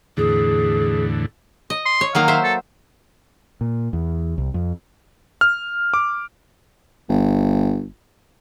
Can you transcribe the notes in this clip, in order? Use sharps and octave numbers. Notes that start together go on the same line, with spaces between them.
E2 A2 D3 G#4
D#5
C6
C#5
D#3 F#3 A#3 F5
C5 E5
A4
A#2
E2
C2
F2
F6
D6
G1